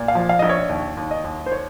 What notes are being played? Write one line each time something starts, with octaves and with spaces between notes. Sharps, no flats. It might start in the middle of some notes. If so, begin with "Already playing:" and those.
Already playing: A#2
F5
F3
F5
A#1 D#5
C#5
D#2
D#2
D#5
D#2
C5
C#5